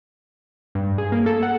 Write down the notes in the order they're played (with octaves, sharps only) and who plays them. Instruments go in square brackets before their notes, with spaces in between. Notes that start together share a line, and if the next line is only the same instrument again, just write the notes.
[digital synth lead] G2
G#4
A#3
A4
F#5